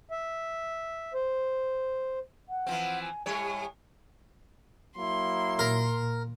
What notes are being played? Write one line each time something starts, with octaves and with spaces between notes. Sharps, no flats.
E5
C5
F#5
E3 F3 C4
G#5
A2 G3 C#5 G#5
F#3 A#3 E4 C6
A#2 A#4